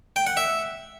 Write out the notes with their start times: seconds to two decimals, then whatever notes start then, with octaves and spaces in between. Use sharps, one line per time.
0.16 G5
0.27 F#5
0.37 E5